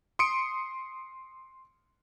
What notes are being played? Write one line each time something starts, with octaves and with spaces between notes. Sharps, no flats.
C6 D#6 C#7 D7